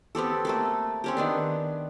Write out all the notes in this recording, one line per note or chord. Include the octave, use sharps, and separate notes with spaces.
B3 C4 G4 A4
A3 A#3 A4
C4 C#4 G4
D#3 B3 D4